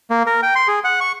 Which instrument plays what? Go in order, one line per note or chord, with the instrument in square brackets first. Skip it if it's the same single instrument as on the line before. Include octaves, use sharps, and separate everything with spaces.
[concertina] A#3
A#4
G5
C6
G#4
F#5
C#6